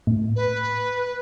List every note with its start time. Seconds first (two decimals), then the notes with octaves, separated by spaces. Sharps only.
0.07 A2
0.36 B4